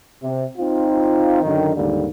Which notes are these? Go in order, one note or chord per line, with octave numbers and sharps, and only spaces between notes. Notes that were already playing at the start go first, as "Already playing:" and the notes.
C3
C4 D#4 F4
F#2 D3 D#3
D#2 G#2 D3 G3 A#3